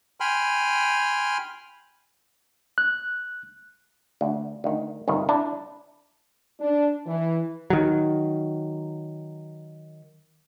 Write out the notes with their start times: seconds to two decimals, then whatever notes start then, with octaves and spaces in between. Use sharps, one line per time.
0.20 G5 G#5 B5 C6 F6
2.78 F#6
4.21 D2
4.64 D2 D#3
5.08 G1 C2 D#3
5.29 D4 E4
6.60 D4
7.07 E3
7.70 D#3 F#3